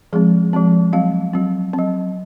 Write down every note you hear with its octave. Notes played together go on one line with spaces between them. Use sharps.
F3 G#3 C4 G#4
F3 G#3 C4
F#3 C4 F5
F#3 C4
C4
F#3